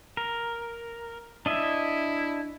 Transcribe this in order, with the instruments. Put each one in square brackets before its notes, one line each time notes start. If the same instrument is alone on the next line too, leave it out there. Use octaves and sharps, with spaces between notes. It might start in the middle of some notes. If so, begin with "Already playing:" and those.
[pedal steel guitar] A#4
[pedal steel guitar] D4 D#5 E5 [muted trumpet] E4